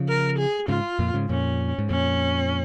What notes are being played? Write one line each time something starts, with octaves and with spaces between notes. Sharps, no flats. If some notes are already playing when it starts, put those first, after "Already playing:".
Already playing: C#3 F3
A#4
G#4
G#2 C#3 F4
F2 A#2
G#2 C#3
F2 A#2 C#4
G#2
F2 A#2 C#4